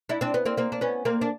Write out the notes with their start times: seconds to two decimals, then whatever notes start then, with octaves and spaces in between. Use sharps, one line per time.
0.09 D4 E4
0.21 C4 D4
0.34 B3
0.45 A#3 C4
0.57 A#3 C4
0.72 D4
0.81 B3 C#4
1.05 A#3 C4
1.21 D4